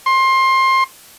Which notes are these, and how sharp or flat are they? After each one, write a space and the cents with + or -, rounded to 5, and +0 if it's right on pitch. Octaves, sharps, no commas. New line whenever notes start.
C6 +20